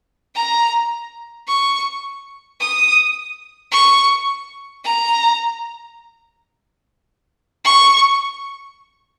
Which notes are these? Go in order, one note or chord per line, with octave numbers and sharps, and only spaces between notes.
A#5
C#6
D#6
C#6
A#5
C#6